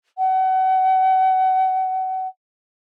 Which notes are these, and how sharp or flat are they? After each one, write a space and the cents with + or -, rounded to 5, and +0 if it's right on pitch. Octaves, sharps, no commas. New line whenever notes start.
F#5 +30